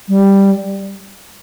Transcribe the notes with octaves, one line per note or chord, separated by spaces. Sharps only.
G3